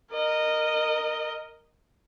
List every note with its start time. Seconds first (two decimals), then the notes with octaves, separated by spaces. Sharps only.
0.13 A#4 D#5